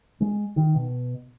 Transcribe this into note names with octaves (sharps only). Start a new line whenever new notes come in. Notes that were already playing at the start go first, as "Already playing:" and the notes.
G#3
D#3
B2